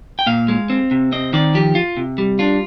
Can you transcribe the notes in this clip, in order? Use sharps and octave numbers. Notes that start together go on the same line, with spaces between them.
G5
A#2 F5
G#3
C4
C3
C4 D#5
D#3 D5
F3 G4
F4
C3
G3
D4 F4